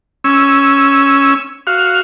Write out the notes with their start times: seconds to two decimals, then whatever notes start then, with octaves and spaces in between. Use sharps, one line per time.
0.24 C#4 E6
1.67 F#4 F5